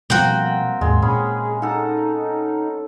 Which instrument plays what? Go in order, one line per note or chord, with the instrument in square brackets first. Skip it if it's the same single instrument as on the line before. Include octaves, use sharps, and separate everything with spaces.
[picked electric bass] B2 F3 G3 [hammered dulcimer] A#3 C4 [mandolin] F#4 G5
[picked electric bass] D#2 G#2 [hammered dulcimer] G#3
[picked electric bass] A#2 [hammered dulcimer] C#4 B5 [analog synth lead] G#4
[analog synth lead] D#4 [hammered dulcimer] A4 F#5